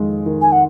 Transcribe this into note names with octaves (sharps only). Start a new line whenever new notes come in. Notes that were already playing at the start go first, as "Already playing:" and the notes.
Already playing: F2 D#3 G#3
D#3
G#5
F#5